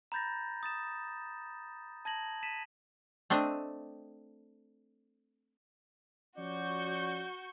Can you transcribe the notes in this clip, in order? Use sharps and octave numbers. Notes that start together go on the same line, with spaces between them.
A#5 B5 G6 A6 A#6
D#6 A6 E7
A5 G#6 A#6 F#7
B6 D#7 E7
A3 C4 D4 D#5
F3 C#4 F#4 D5 C#6 G6